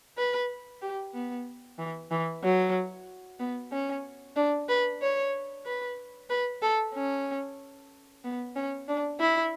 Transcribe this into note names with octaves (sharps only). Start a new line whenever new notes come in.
B4
G4
B3
E3
E3
F#3
B3
C#4
D4
B4
C#5
B4
B4
A4
C#4
B3
C#4
D4
E4